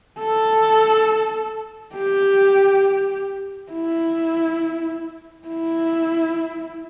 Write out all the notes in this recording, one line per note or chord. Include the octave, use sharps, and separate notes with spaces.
A4
G4
E4
E4